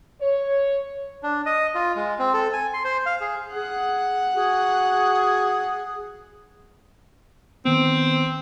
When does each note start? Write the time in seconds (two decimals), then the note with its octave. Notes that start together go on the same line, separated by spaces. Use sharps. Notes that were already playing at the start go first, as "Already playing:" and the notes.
0.21 C#5
1.23 D4
1.46 D#5
1.75 F4
1.96 G#3
2.19 C4
2.34 A4
2.53 G#5
2.74 C6
2.85 C5
3.06 F5
3.21 G#4
3.56 G#4 F#5
4.35 F#4 G#4
7.65 D#3 B3 C4